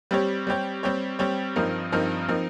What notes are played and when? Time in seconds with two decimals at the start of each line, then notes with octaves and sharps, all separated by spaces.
0.11 G3 C4 G4 C#5
0.47 G3 C4 G4 C#5
0.83 G3 C4 G4 C#5
1.19 G3 C4 G4 C#5
1.56 G2 F3 C4 D#4 A#4
1.92 G2 F3 C4 D#4 A#4
2.28 F3 C4 D#4 A#4